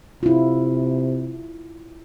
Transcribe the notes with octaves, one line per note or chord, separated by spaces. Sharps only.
C3 E4 F4